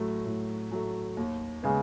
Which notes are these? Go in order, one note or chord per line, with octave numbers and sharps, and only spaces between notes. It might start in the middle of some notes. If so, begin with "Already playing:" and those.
Already playing: A2 F#3 A3
A2
F#3 A3
D#2
C#3 G#3 B3